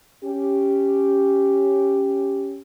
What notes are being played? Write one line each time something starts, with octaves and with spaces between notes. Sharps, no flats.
C#4 G4